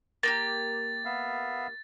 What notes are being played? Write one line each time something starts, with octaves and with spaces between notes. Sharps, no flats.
A#3 F4 G4 A6
B3 E5 F5